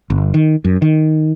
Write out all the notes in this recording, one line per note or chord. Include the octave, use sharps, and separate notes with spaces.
G1
D#3
F#2
D#3